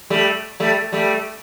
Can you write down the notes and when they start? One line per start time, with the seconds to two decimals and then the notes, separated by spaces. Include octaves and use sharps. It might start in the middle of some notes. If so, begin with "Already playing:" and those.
0.10 G3 A3
0.60 G3 A3
0.92 G3 A3